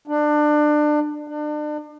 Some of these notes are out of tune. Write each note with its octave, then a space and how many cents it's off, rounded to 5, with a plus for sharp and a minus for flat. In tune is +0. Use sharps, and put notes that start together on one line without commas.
D4 +25
D4 +35